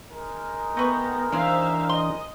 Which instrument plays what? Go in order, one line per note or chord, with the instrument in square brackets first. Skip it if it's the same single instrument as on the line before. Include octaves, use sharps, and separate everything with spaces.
[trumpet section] G#3 D#4 A#4
[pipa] A3 B4 C#6 [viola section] B3 [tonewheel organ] G5 A#5
[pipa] D#3 C4 G#4 [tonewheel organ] E3 D4 [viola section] C5 E5 F5
[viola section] D#5 [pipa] C6